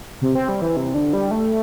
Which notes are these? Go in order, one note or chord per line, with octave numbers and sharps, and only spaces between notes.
C3
C4
G3
E3
C3
D3
G3
A3